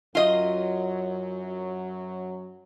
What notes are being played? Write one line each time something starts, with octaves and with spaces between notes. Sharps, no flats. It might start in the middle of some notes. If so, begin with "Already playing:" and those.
F#2 F#3 F4 D#5